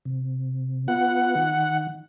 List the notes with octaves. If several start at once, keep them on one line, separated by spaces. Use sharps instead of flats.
C3
B3 F4 F#5
D#3